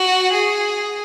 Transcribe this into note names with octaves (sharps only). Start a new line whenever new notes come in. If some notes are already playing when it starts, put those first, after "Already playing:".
Already playing: F#4
G#4